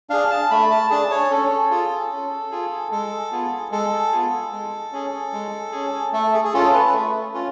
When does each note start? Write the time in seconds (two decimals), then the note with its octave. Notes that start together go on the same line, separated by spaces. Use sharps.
0.10 D4 G#4 F5
0.30 A5
0.51 A3 B5
0.71 A5
0.90 D4 G#4 A5
1.11 C#5
1.30 C#4 A4
1.71 F4 G#4
2.12 C#4
2.51 F4 G#4
2.91 G#3 A4
3.32 B3 F4 G#4
3.71 G#3 A4
4.12 B3 F4 G#4
4.52 G#3
4.92 C#4 G#4
5.33 G#3
5.72 C#4 G#4
6.13 A3 A4
6.34 G#4
6.44 G#4
6.54 C#4 F4 A4
6.73 B4
6.93 A3
7.34 C#4 F4